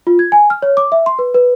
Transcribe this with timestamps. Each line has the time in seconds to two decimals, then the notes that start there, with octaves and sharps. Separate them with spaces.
0.07 F4
0.19 G#6
0.32 G#5
0.50 F6
0.62 C#5
0.77 D6
0.92 E5
1.06 C6
1.19 B4
1.34 B4